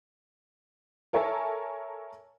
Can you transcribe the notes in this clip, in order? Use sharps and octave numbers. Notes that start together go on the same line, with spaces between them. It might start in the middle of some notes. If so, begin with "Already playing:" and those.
A4 A#4 C#5 E5 G#5 A5